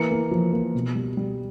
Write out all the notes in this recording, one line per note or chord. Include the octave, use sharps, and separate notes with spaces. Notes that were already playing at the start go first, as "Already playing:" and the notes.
Already playing: E3 A#3 C#7
A#3
F3
A#3
B2
G3
G3